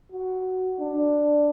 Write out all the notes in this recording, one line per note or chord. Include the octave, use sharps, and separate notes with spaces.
F#4
D4